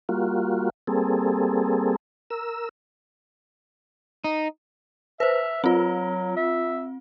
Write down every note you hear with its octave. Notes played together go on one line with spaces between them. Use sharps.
G3 A#3 F4 F#4
G3 A#3 C4 G#4 A4
A#4 E6
D#4
B4 C5 E5
F#3 C4 F4
E5